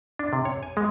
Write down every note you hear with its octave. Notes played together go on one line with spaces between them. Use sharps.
D4
C3
C#5
G#5
G#3